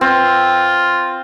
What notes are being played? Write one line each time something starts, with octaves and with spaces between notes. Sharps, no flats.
C4 F4